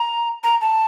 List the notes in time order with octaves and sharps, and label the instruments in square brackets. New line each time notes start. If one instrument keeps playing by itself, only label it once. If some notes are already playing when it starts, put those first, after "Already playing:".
Already playing: [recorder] A#5
A#5
A5